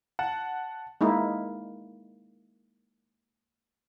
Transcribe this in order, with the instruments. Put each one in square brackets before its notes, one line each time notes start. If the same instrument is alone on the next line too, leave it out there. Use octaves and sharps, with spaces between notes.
[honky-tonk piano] F#5 [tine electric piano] A5
[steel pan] G#3 A#3 D#4 E4